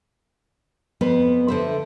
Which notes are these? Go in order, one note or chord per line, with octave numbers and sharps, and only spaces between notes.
F2 B3 B4 C5
D3 C5 E5